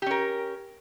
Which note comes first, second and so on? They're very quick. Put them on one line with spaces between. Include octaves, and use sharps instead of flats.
G4 C#4 A#4